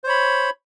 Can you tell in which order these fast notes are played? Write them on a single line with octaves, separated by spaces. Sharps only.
C5 C#5 B5